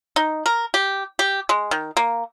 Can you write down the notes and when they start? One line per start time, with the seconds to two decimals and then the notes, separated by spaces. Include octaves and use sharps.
0.16 D#4
0.46 A#4
0.74 G4
1.19 G4
1.49 G#3
1.71 D#3
1.97 A#3